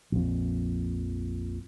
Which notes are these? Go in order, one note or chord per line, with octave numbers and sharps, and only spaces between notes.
A#1 F2